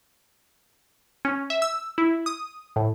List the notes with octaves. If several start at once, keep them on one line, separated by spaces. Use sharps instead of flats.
C#4
E5
E6
E4
D#6
A2